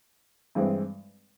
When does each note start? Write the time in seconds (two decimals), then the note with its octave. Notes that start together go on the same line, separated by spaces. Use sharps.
0.55 G2 E3 G#3 C4